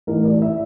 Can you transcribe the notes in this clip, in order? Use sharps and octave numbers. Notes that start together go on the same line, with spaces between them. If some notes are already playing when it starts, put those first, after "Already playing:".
A1 A2 E3 A#4
D5
E5